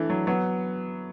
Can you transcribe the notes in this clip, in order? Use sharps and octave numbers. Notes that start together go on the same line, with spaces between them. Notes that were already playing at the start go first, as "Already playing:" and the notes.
Already playing: E3 A3 D4
F#3
F#3 B3